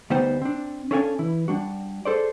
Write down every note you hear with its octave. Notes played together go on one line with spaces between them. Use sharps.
D2 G3 B3 D#4 C5 G5
C4 D4
C#4 D4 A4 F5 F#5 G#5
E3 E4
G3 D4 F#4
G#4 A4 C5 D5